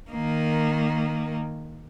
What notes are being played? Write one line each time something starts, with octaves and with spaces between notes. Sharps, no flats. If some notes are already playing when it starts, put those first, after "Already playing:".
D#3 A#3